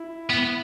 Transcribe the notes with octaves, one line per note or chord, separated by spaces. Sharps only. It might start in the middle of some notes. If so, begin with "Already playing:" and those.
Already playing: E4
B3